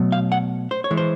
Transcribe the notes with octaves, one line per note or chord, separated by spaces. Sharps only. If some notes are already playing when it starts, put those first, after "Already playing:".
Already playing: B2 F#3 A3
F5
F#5
C5
C#5
E3 G#3
C5